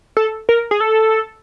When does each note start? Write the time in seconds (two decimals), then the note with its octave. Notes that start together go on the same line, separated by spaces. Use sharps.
0.17 A4
0.49 A#4
0.71 G#4
0.81 A4